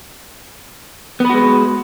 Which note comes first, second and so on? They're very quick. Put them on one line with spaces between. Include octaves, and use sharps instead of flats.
B3 B4 F#4 G#3